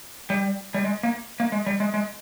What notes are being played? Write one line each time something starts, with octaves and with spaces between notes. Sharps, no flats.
G3
G3
G#3
A#3
A#3
G#3
G3
G#3
G#3